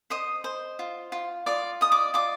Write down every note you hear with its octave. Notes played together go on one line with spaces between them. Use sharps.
C5 D#5 D#6
C5
F4
F4
F4 D5 D6
D#5 D#6
D5 D6
F4 D5 D6